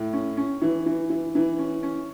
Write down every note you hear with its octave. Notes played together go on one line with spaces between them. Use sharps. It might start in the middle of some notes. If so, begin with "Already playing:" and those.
Already playing: A2
C#4
C#4
E3
E3
E3
E3
C#4
C#4